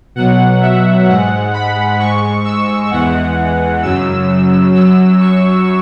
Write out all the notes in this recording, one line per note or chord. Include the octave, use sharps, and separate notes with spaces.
B2 F#3 F#5
E5
G#2 G#3 F#5
B5
G#2 G#3 C#6
E6
E2 E3 G#3 F#5
F#2 C#3 F#3 E6
F#2 F#3 E6
C#6